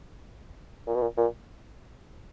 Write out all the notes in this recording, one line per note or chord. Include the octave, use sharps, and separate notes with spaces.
A#2
B2
A#2
A#2